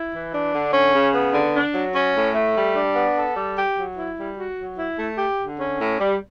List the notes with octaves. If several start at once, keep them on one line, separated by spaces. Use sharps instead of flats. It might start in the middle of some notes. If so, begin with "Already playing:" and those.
Already playing: E4
E3
D4
D3
C#4
C#3
B3
D3
D4
F#3
C#4
A2
A3
G3
D4
B3
A4
G3
G4
F#3
E4
G3
F#4
F#3
E4
A3
G4
D3
C#4
A2
G3